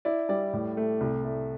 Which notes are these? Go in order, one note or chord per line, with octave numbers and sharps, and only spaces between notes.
E4 D5
G3 D5
A2
A3
C2
A3